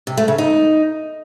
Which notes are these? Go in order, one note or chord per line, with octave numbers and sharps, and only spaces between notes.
C3
A3
C#3
D#4